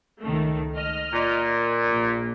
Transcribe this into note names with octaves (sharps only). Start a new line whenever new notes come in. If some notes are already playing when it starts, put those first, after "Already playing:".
C#2 D#3 A3
D#5 F6
A#2
A#1